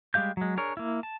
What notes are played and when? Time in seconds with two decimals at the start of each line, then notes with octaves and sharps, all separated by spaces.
0.14 G3 G#3 G4 F5 G6
0.37 F#3 G#3
0.57 D4 G#4 A#4 C#5
0.77 A#3 E4
1.03 A5